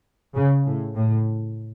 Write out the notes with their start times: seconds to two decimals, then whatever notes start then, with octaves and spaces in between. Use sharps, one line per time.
0.35 C#3
0.65 A2
0.95 A2